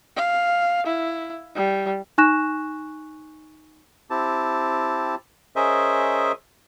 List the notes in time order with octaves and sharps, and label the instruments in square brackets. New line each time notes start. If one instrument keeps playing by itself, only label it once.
[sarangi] F5
E4
G3
[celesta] D#4 G#5 C#6 F#6 A#6 E7
[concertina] C4 E4 G4 A5
C#4 G#4 A#4 C5 D#5 E5